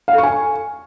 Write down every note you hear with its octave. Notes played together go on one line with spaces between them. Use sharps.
F5
A4
C#6
G#5